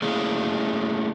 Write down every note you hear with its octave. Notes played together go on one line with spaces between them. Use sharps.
A3 A#3 C#4 E4 G#4